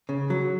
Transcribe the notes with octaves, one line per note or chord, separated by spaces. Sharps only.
C#3
F#3